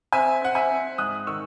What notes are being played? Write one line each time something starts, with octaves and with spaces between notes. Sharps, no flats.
C4 E5 G#5
C4 F#5
E5 G#5
C4
G#2 D#6 F#6
D#3 C#6 E6